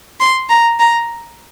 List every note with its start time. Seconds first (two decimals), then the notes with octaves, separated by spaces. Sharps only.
0.20 C6
0.50 A#5
0.79 A#5